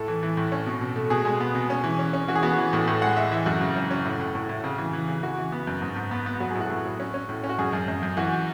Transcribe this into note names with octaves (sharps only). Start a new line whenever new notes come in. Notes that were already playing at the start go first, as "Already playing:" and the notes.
Already playing: A2 A4
E3
E3
A2
C#4
B2
B2
A3
B2 G#4
G#3
B3
B2
C#4
E3
C#4
C#4
E3 F#4
G#4
B3 F#4
E3
A2
A2
G#3 F#5
G#3 E5
E3 E5
F#2 F#4
C#3
F#3
C#4
A2
A2
A2
A2
C#3
E3
E3
C#3
E3 F#4
E3
B3
F#2
G#2
G#2
B3
B3
F#3 F#4
A2 G#4
F#4
A2
F#3
C#4
C#4
A2
C#4
F#4
F#2 G#4
F#2
F#2
F#2
E3 F#4